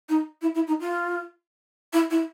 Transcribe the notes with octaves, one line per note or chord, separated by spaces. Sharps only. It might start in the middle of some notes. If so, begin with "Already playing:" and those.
D#4
E4
E4
D#4
F4
E4
E4